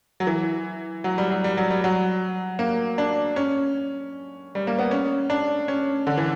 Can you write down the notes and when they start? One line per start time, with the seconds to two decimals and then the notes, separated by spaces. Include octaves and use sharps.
0.20 F#3
0.27 E3
1.04 F#3
1.18 G3
1.31 F#3
1.44 G3
1.57 F#3
1.71 G3
1.84 F#3
2.59 A#3
2.98 D4
3.36 C#4
4.55 G3
4.67 A#3
4.79 B3
4.91 C#4
5.30 D4
5.68 C#4
6.07 D3
6.17 E3